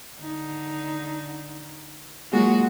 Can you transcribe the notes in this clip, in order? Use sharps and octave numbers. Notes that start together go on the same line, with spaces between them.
D3 D#4
F#3 G#3 A#3 F4 F#4